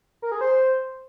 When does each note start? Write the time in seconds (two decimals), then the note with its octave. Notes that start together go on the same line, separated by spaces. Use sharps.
0.22 A#4
0.32 G#4
0.41 C5